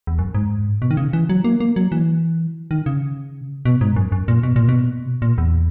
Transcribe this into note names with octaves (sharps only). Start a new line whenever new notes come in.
E2
F#2
G#2
B2
D#3
C#3
E3
F#3
A#3
A#3
F#3
E3
D#3
C#3
B2
G#2
F#2
F#2
A#2
B2
A#2
B2
A#2
E2